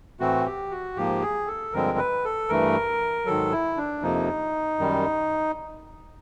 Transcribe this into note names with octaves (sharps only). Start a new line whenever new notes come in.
A2 E3 A3 C4 F#4
G4
F#4
G#2 F3 A#3 G4
G#4
A4
G2 D3 F3 G#3 C4 A#4
B4
A4
G2 E3 A3 A#4
G#2 D#3 F#3 A4
E4
D4
F2 C3 F3 A#3 D#4
F#2 D#3 G3